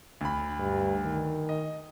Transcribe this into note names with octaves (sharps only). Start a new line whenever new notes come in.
D2 B5
G2
D#3
D#5